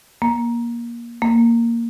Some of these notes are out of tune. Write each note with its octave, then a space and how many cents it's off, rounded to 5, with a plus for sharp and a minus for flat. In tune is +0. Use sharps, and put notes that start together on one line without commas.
A#3 +20
A#3 -5